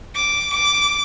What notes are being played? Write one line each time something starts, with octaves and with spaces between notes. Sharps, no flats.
D6
D6